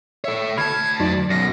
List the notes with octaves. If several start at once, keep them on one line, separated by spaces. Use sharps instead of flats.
A4 C#5 E5
D2 A5 B5 F6 G#6
F2 F#3 D#4 D5
F#2 B2 A#6